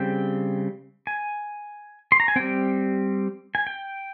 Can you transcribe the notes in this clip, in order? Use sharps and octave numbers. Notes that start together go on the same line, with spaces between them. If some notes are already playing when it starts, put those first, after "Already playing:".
Already playing: C#3 G3 C4 G5
G#5
C6
A#5
G#5
G3 C4 G5
G#5
G5